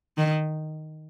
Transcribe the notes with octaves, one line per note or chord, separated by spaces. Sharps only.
D#3